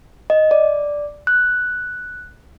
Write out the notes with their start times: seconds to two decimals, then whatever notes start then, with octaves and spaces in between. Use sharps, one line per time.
0.30 D#5
0.51 D5
1.27 F#6